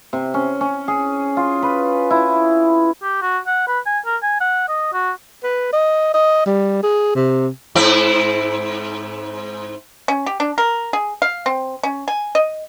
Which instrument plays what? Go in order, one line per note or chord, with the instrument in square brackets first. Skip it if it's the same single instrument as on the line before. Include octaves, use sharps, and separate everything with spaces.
[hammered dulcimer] C3
C#4
C#4
G#4
F4
B4
E4
[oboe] G4
F#4
F#5
B4
G#5
A#4
G#5
F#5
D#5
F#4
[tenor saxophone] B4
D#5
D#5
G3
G#4
C3
[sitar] G#2 C4 E4
[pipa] C#4
G4
D4
A#4
G#4
F5
C4
C#4
G#5
D#5